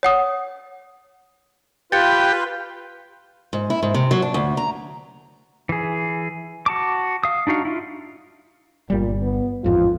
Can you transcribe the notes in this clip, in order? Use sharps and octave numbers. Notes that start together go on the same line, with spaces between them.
C#5 F#5 D#6
F4 G4 B4 A6 C#7
G#2
E4
G#2
C3
F#3
D4
D2
A#5
E3 G#4
F#4 A5 D6
F5 D#6
D4 D#4 F#4 F5
E4 F4
G1 A#2 G3
B3
A1 F2 G#2 F4